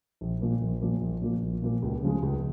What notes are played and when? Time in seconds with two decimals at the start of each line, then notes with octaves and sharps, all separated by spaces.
0.21 A#1
0.41 A#2 F3 A#3
0.61 A#1
0.81 A#2 F3 A#3
1.01 A#1
1.22 A#2 F3 A#3
1.42 A#1
1.62 A#2 F3 A#3
1.82 C#2
2.02 C#3 F3 G#3
2.22 C#2